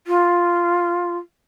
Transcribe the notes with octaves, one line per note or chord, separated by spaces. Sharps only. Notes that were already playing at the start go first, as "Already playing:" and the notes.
F4